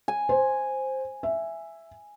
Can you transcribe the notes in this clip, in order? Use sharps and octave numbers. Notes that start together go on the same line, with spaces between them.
G#5
C5
E5